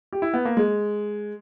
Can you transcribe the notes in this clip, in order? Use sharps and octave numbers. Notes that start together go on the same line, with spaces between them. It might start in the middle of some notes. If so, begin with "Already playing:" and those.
G4
E4
B3
A#3
G#3